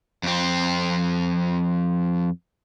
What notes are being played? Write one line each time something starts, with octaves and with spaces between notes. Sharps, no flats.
F2 C4